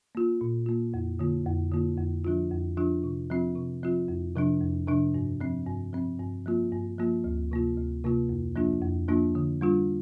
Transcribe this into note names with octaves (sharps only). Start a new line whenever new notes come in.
A#3 F4
A#2
A#3 F4
F2
D3 A#3 F4
F2
D3 A#3 F4
F2
F3 D4 F4
F2
F3 D4 F4
C3
F3 C4 F4
C3
F3 C4 F4
F2
C3 F3 D4
F2
C3 F3 D4
G2
F3 C4
G2
F3 C4
G2
F3 A#3 F4
G2
F3 A#3 F4
D2
C3 A#3 F4
D2
C3 A#3 F4
F2
F3 A#3 D4 F4
F2
F3 A#3 D4 F4
D3
G3 D4 F4